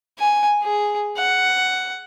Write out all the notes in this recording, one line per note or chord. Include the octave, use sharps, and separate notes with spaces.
G#5
G#4
F#5